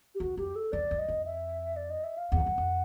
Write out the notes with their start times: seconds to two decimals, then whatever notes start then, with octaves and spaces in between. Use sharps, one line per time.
0.15 G4
0.20 E2 F#4
0.37 F2 G4
0.56 A4
0.72 E2 D5
0.91 F2
0.99 D#5
1.08 F2
1.25 E5
1.76 D5
1.90 D#5
2.04 E5
2.18 F5
2.32 E2 F#5
2.46 F#2
2.58 F2